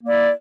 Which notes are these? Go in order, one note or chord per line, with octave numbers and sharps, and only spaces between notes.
A#3 E4 D5